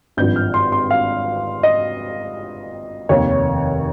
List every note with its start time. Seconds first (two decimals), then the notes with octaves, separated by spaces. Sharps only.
0.17 G#1 G2 F3 G6
0.36 F6
0.54 C6
0.72 C6
0.91 F5
1.63 D#5
3.09 F1 D#2 D#3 C#5